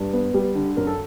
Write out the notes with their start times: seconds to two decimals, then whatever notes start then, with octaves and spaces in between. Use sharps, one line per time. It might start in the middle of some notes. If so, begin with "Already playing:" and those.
Already playing: G2
0.13 B3
0.34 G3
0.55 D3
0.77 F#2 A#4
0.87 A4